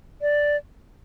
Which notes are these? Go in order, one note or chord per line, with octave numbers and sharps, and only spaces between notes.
D5